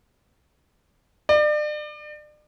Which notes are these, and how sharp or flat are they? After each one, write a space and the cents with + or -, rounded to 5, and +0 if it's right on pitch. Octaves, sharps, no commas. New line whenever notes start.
D5 +35